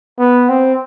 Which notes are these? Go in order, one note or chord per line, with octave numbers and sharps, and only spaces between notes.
B3
C4